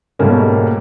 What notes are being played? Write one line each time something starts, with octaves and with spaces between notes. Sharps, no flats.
G#2 B2 G3 A3 A#3 C#4